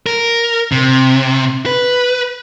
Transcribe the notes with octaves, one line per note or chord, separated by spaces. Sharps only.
A#4
C3
B4